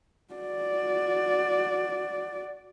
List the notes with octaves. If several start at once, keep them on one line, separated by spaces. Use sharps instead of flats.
F#4 D5